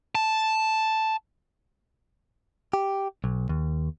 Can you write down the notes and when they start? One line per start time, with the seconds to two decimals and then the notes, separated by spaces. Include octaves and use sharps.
0.15 A5
2.73 G4
3.24 B1
3.49 D#2